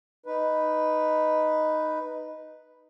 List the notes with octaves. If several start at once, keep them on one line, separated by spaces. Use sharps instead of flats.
D#4 B4